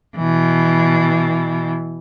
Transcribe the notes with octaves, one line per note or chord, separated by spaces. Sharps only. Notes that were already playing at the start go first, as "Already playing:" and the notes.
B2 E3